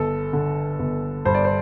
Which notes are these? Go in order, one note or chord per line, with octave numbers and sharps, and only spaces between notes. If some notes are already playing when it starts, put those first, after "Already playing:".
Already playing: G1 A4
D3
G1
G2 C5
D5
C5